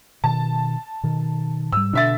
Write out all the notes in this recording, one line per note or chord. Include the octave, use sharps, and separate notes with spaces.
B2 D#3 A5
B2 D#3
G#2 G3 E6
B2 D3 E5 A6